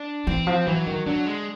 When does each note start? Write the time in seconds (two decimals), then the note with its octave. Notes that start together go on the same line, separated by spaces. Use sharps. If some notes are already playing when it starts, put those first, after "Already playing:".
Already playing: D4
0.27 E3 C4
0.47 F3
0.66 E3 F#3
0.87 D#3
1.06 D3 F#3
1.26 G#3